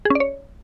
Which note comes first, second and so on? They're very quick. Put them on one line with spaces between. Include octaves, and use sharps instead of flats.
G#4 C#4 D5 C#5